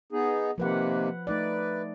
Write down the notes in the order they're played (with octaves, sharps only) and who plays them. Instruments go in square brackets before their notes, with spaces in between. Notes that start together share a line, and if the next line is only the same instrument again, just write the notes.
[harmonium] B3 D#4 G#4
[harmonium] C3 D#3 A#3 [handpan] F3 B4 F#5
[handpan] A3 D#4 D5 [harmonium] B4